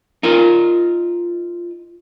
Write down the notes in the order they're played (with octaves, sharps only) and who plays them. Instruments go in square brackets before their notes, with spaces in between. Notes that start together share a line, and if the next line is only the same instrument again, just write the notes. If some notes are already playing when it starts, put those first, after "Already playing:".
[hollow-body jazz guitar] D#4 F4 A#4